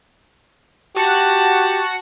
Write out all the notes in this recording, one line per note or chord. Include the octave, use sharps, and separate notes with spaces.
F#4 G4 F#5 A5